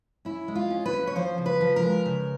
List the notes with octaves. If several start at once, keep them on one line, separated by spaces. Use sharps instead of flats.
C#4 E4
G#3
F4
C#4
B4
C#4
C#5
F3 C5
C#3
B4
F3
A#4
G#3
C#3